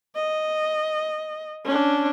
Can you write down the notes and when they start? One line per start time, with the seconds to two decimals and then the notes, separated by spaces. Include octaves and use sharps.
0.16 D#5
1.65 C#4 D4